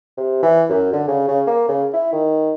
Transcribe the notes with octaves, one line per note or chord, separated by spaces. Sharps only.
C3
E3
F#2
D3
C#3
C#3
A#3
C#3
E4
D#3